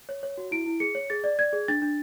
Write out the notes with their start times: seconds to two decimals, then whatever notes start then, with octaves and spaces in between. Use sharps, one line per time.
0.09 C#5
0.23 C#5
0.38 F#4
0.51 E4 D7
0.66 E4
0.80 G#4 C#7
0.95 C#5
1.10 G#4 A6
1.24 D5
1.39 D5 G#6
1.53 G#4
1.68 D4 A6
1.82 D4